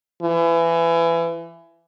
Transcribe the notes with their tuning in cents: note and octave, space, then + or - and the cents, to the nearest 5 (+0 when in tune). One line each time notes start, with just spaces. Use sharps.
E3 +25